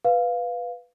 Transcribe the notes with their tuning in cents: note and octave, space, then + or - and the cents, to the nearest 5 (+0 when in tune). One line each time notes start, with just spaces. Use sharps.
B4 +0 F5 +0